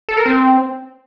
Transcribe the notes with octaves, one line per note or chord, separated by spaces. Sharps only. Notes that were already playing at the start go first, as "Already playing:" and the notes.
A4
A#4
C4